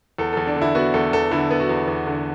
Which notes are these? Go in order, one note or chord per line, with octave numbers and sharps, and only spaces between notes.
E2 A4
E2 A4
D4
D3
E4
B3 F#4
E2 A4
E2 A4
D3 E4
B3
F#4
E2
E2
D3